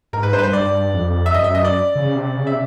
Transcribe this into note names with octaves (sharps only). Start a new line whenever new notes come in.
G#2 A#4
B4
G2 C5
B4
C5
G2 D5
F2
E5
F#2 D#5
E5
D#5
D5
C#3
C3
C#3
E5
C3